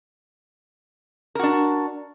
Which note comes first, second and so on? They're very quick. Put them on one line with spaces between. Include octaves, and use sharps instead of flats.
A#4 F#4 D4